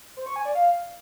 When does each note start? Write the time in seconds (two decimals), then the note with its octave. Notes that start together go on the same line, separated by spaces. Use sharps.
0.17 C5
0.26 C#6
0.36 G#5
0.45 D5
0.55 F5